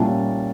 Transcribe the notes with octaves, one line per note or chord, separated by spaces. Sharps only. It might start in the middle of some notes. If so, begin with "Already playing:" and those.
Already playing: A#2 G3 C#4 E4 A5